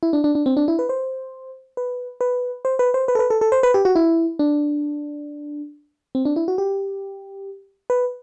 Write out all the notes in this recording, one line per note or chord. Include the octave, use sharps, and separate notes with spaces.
E4
D4
D4
D4
C4
D4
E4
B4
C5
B4
B4
C5
B4
C5
B4
A4
B4
A4
A4
C5
B4
G4
F#4
E4
D4
C4
D4
E4
F#4
G4
B4